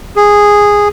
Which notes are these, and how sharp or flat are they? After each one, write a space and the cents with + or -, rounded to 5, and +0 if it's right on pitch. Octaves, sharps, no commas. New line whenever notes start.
G#4 -10